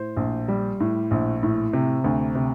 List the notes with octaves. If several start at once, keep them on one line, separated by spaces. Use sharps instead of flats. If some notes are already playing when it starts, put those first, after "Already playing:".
Already playing: A2 C5
A#1
G3
A2
A#1
A2
C3
D2
C3